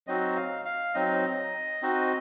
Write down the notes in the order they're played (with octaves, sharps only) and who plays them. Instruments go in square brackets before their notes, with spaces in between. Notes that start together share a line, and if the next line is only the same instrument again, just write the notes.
[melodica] F#3 C4 D#4 F#4 D#5
F5
F5
F#3 C4 D#4 D#5
C4 D#4 F#4